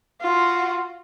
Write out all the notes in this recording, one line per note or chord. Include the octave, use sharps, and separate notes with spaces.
F4 F#4